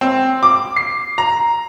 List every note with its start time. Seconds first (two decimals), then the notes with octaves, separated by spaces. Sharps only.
0.01 C4
0.43 D6
0.76 C7
1.18 A#5